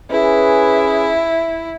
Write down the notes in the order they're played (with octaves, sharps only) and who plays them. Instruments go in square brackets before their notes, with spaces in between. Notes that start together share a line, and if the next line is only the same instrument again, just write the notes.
[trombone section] C#4 G#4 B4 [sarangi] E4